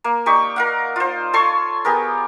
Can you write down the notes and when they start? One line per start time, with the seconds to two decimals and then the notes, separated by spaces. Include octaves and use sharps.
0.04 A#3
0.26 D#4 G4 D5 C#6
0.56 A#4 F5 F#5
0.96 F4 C5
1.34 A4 C#5 C6 C#6
1.85 B3 G4 G#4 A#4